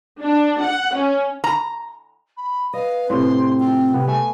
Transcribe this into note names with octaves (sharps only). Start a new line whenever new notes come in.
D4
F#5
C#4
A#5
B5
B4 D#5 F5
A2 C3 C4 C6
F4 G5
C3 B3
A3 G#5